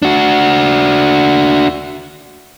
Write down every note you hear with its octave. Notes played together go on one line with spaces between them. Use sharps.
D4 F#4